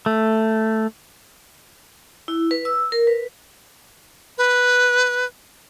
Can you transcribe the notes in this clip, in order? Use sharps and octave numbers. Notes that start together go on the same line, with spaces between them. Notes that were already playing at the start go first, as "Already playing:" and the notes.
A3
E4
B4
E6
A#4
B4
B4